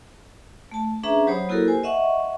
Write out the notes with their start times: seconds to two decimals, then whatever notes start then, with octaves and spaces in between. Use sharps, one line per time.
0.72 A3 A5
1.03 C#4 D4 G#4 B4 E5 A#5
1.27 F#3 G4 C5 C#5 B5 D#6
1.49 A#3 E4 F#4 G4 A4 A#4
1.68 C5 G#5
1.83 D#5 E5 F#5 C#6